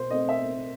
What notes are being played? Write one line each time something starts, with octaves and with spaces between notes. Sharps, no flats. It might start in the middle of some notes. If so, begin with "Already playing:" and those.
Already playing: B2 C5
A3 C4 D#5
E5